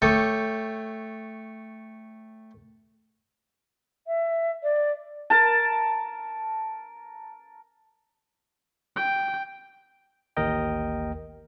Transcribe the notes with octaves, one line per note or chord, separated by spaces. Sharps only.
A3 A4 C#5 G5 D6 D#6
E5
D5
A#4 A5
G5
A1 D#2 A#4 D#5 G5